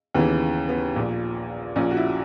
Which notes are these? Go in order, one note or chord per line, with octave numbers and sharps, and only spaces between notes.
D#2 C#3 E3 B3
B3
A#1 A#2
A#1 A#2 C#4
F#4
E4